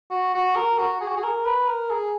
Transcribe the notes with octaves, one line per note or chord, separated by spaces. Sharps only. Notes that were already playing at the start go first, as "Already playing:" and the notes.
F#4
F#4
A#4
F#4
G#4
F#4
G#4
A#4
B4
A#4
G#4